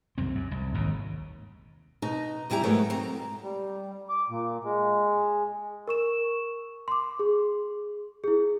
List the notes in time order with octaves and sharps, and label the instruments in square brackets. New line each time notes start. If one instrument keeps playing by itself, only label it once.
[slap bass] C2 F#2 C4
F#2
C2
G#1 D#2 B2
[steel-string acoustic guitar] B2 D#4
E2 G3 E4 G4 A#5
G#2 F#3 A3 B3 A#4
C4 A#5
[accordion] G3
D6
A#2
G#3
[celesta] A#4 C#6 E7
C6 D6
G#4
E4 G#4